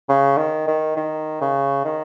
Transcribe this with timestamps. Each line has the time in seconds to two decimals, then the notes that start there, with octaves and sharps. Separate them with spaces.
0.09 C#3
0.37 D#3
0.68 D#3
0.96 D#3
1.41 C#3
1.85 D#3